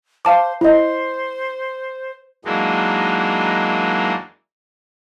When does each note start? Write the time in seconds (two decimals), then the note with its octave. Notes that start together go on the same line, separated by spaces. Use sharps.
0.25 C5 F5 A5 D6
0.61 E4 C5 D#5
2.45 E3 F#3 G#3 A#3 D4 D#4